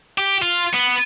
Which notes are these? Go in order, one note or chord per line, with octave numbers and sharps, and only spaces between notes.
G4
F4
B3